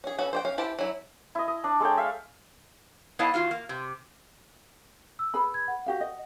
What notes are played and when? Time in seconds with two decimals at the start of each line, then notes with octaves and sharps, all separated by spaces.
0.04 C#4 G#4
0.18 B3 C#4 F#4 A4
0.33 C5 D5 G5
0.45 C#4 F5
0.58 E4 G4 C5 A5
0.79 F#3 E4
1.35 E4 D#5
1.48 D#5
1.64 D4
1.80 G#3 A4 C#5 G5
1.98 E5 F5
3.19 B3 E4 C#5 D#5 F5 A5
3.34 E2 F4 F#4 F5
3.51 A#3
3.69 C3
5.19 E6
5.34 G#4 B4 B5
5.54 G#6
5.68 F#5
5.86 F#4 G4 F5
6.01 D#5